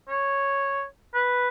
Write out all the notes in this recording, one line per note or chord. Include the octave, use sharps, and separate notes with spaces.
C#5
B4